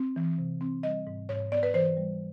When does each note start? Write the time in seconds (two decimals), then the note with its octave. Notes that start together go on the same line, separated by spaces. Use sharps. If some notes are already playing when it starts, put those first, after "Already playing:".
Already playing: C4
0.16 E3
0.38 C3
0.61 C4
0.83 G3 D#5
1.07 G#2
1.29 G#2 C#5
1.52 B3 D5
1.63 B4
1.74 E3 C5
1.97 G3